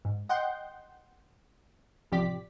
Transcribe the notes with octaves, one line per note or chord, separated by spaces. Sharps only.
G#2
D#5 F#5 G5 C6 G6
A1 C3 F3 G4 D5 B6